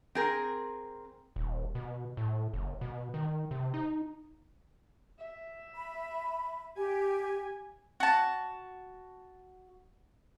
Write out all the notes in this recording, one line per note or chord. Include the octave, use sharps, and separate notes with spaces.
C4 G#4 A#4
D#1
B2
A2
F#1
B2
D#3
C3
D#4
E5
B5
G4 G#5
F#4 A5